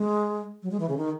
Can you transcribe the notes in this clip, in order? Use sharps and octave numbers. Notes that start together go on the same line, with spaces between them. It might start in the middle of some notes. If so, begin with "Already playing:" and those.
Already playing: G#3
F#3
G#3
E3
C#3
D#3